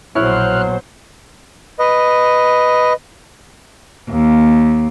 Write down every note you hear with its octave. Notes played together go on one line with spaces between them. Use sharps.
A#1 B2 F#3 E4 C5 C#5 F6 F#6
B4 D#5
D#2